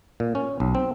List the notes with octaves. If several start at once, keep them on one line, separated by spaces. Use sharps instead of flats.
A#2
C#4
B1
C4